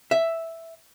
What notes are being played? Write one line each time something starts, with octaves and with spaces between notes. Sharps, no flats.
E5